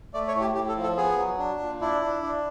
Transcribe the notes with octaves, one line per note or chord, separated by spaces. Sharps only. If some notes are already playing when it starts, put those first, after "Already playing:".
A3 D5
C#5
A2
G4
A2 G4
A4
F3
A4
B3 G#4
F#3
D4
A#2
D4 E4
D4
D4